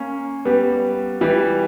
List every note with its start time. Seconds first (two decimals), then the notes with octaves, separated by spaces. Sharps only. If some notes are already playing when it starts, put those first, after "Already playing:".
Already playing: A#3 C#4
0.45 G3 B3
1.21 E3 G3